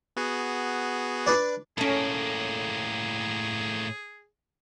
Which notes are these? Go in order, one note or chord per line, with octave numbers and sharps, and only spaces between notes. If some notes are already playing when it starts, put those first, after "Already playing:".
B3 F#4 G#4
D4 B4 D5
A2 A#3 C#4 G#4 A4